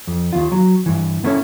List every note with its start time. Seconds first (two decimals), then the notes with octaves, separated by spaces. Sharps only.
0.07 F2
0.33 D#2 F4
0.52 F#3
0.86 G2 E3
1.24 A#3 B3 C#4 E4 A4 C#5